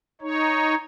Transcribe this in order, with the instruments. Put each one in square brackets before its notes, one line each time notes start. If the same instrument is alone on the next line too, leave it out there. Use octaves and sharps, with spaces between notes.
[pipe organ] D#4 C#5